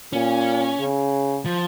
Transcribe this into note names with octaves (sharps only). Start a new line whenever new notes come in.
A#2 C#4
C#3
F3